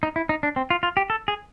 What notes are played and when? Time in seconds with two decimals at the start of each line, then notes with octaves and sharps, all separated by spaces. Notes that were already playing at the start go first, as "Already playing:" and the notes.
0.03 D#4
0.16 E4
0.29 D#4
0.43 D4
0.56 C4
0.70 F4
0.83 F4
0.97 G4
1.10 A4
1.28 G#4